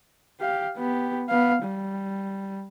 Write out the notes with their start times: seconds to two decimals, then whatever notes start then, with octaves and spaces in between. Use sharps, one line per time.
0.40 G4 F5
0.77 B3 G4
1.29 B3 F5
1.63 G3